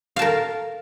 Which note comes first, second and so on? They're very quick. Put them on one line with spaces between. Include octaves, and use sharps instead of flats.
F5 A5 A#4